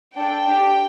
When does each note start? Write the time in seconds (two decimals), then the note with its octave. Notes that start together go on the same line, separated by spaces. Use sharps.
0.16 D4 A4 G5
0.46 D4 G4